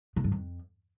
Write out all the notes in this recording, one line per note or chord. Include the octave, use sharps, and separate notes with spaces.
B2
G2
F2